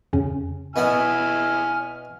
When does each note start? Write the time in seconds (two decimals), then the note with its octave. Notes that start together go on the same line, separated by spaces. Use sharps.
0.13 F2 C#3 C#4
0.76 B2 B3 E4 G#5 B5 F6